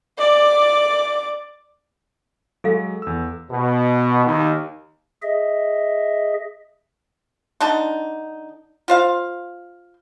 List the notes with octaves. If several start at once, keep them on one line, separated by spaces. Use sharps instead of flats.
D5 D6
F#3 G#3 A4 F5
E2 E6
B2
D#2 D#3
G#4 D#5 E5
D3 D4 D#4 A5
F4 C5 F5